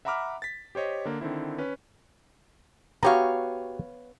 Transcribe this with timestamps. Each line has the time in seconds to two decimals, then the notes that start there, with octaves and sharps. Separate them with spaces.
0.05 E5 F#5 A#5 B5 D6 F6
0.42 A6 B6
0.75 G4 C5 C#5 D#5
1.05 D3 A#3
1.21 D3 D#3 C4 E4
1.58 C#4 B4
3.03 B3 F#4 G4 C#5 F5 A#5